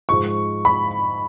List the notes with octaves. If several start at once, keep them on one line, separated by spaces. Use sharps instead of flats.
G#2 F3 G#3 C#6
B5